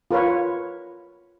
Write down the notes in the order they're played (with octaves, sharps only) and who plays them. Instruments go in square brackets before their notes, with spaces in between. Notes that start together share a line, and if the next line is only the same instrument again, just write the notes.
[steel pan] F4 A#4 B4 C#5